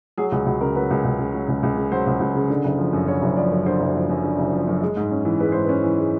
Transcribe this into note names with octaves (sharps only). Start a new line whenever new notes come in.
F#3 G#4
C#2 G#4
C#2 F#4
C#3 A#4
F#3 B4
C#2
C#2
C#3
F#3
C#2
C#2
C#3
F#3 C5
C#2
C#2
C#3
D3
F#1
F3
F#2
D3 C#5
F#1
F3 D5
F#2
D3 C5
F#1
F3
F#2
D3
F#1
F3
F#2
G#3
G#2
C#4
E3
G#3 B4
G#2 C5
C#4 B4
E3
G#3